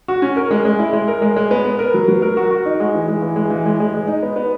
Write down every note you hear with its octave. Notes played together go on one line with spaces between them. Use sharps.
F#4
C#4
A#4
G#3
G#3
E4
G#3
A#4
G#3
G#3
B3
B3
A#4
F#3
F#3
A#4
F#4
F#4
D#4
G#3
E3
G#3
E3
G#3
E3
G#3
G#3
G#3
D#4
B3
B3